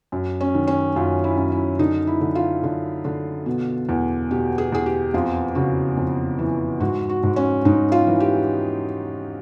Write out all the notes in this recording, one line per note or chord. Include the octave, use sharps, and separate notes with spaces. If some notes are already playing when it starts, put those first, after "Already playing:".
F#2
C#4
D#3
C#4
F#2 F4
E4
F#2
E4
D3 D#4
E4
D3
F4
D3
D3
B2
E2
B2 G4
G#4
E2 G#4
G4
F2 F4
C#3 F#4
F2
E3
G#2 F#4
F#4
G#2
C#4
G#2 D#4
F4
E3
G4